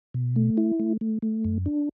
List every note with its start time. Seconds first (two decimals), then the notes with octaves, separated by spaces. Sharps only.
0.14 B2
0.36 A3
0.57 E4
0.80 A3
1.01 A3
1.22 A3
1.45 F#2
1.66 D4